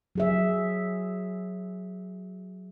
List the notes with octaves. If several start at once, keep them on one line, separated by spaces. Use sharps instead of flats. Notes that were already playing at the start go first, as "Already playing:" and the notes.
F#3 G#4 E5